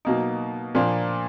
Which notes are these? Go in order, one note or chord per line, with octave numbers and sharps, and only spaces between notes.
B2 F#3 A#3 D#4
A#2 F3 A#3 D4